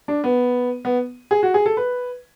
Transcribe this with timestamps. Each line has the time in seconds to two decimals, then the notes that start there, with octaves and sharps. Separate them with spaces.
0.08 D4
0.24 B3
0.85 B3
1.31 G#4
1.43 F#4
1.54 G#4
1.66 A4
1.77 B4